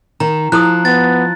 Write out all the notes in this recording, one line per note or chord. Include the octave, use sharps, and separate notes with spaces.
D#3 A#5
F3 E4 A4 D#6 F#6
B3 A6